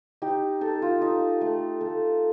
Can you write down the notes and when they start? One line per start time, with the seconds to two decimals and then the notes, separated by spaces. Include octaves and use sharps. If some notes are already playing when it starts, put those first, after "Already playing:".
0.22 D#4 G4
0.61 D#4 A4
0.82 F4
1.02 D#4
1.41 A3
1.81 A3 A4